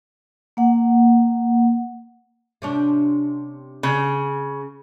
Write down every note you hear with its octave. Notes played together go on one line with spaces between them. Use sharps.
A#3 F#5
C3 C#4 D4
C#3